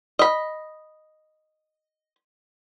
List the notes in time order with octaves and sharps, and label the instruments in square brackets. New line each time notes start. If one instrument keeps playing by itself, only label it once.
[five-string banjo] D#5 B5